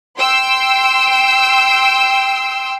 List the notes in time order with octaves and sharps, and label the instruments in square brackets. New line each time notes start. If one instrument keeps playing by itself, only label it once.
[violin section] G5 C6 E6